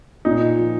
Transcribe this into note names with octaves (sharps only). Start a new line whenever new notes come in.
A#2 D#4
F3